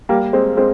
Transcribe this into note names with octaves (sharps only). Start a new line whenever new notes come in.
G3 A#3
G#3 C4
G#3 C4